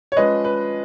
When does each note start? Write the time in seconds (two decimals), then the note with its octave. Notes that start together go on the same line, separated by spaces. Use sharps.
0.12 C#5
0.17 F3 G#3 C#4 B4 D#5
0.45 B4